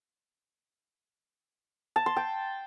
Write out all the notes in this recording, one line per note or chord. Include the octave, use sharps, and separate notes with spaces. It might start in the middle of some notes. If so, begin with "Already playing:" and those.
A5
C6
G5